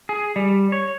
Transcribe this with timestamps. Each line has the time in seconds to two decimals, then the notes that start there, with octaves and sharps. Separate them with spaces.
0.09 G#4
0.36 G3
0.72 C#5